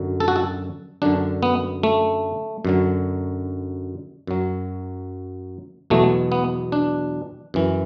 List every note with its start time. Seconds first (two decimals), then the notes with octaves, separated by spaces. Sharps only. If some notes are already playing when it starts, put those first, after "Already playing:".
Already playing: F#2 D3 F#3
0.20 A4
0.28 F#4
0.36 A4
1.02 F#2 D3 F#3 D4
1.43 B3
1.83 A3
2.65 F#2 D3 F#3
4.27 F#2 F#3
5.90 E2 B2 F#3 A3
6.32 B3
6.72 D4
7.54 F#2 E3